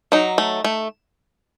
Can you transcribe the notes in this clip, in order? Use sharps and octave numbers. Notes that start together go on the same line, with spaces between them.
F#3 D#4
A3
A3